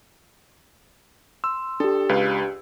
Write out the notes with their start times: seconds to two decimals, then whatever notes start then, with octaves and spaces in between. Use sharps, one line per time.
1.44 C6 E6
1.80 D4 G4 A4
2.09 C#2 B4 F5